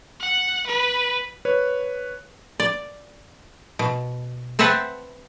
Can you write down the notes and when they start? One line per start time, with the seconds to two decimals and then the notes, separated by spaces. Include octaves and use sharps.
0.20 F#5
0.67 B4
1.45 B4 C#5
2.60 D5
3.79 B2
4.59 C4 B4 C5 E5 F#5 A5